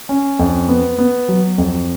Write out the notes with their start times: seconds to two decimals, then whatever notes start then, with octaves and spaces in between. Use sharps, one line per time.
0.09 C#4
0.39 F2
0.69 B3
0.98 B3
1.28 F#3
1.58 F2